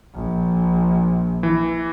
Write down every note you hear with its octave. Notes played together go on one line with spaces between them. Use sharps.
A#1
E3